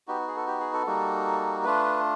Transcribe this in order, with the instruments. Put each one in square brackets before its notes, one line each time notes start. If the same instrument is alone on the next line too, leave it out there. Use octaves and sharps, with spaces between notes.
[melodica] B3 D#4 F#4 G4
G#4
A4
G4
G#4
A4
G3 A#3 D#4 F#4
A3 D4 F4 B4